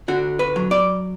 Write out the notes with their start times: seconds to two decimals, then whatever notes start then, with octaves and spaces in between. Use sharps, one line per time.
0.08 D3 F#4
0.39 B4
0.56 F#3
0.71 D5